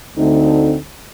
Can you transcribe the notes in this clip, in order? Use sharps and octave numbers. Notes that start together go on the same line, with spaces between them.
D2 D3 A3 C4 D#4